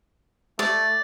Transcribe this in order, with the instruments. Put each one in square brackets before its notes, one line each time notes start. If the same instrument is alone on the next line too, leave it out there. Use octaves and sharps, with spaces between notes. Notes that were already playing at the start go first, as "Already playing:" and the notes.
[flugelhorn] A3 [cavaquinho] D5